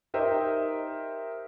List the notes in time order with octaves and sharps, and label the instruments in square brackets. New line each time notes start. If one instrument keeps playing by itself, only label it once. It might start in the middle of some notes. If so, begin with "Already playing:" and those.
[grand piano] D#4 G4 A#4 C5 D#5 E5